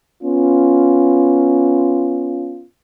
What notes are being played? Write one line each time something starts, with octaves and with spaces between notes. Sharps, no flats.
B3 C#4 F4